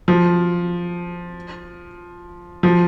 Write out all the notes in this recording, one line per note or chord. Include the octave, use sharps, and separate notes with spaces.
F3
F3